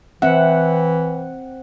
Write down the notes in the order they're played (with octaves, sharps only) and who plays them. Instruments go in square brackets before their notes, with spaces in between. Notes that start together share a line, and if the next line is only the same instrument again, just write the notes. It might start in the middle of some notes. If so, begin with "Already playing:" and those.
[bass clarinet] E3 [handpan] C4 F#5 [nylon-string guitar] E5